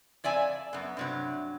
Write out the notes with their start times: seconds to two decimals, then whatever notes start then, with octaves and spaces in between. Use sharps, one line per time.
0.24 F2 D5 E5 G#5
0.73 F#2 B3
0.97 G2 C3 F#3